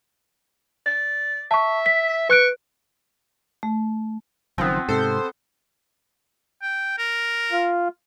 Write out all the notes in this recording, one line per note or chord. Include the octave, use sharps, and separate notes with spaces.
D5
E5 A5 C#6
B6
B4 C#6 F#6 D7
A3
F#1 F#2 D#3 F3 B3 C4
G#2 C3 A4 C5
G5
A#4
F4